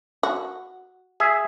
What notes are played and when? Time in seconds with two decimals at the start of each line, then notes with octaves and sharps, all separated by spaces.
0.23 F#4
1.20 G#4 E5